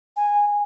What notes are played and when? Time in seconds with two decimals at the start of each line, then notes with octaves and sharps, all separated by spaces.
0.17 G#5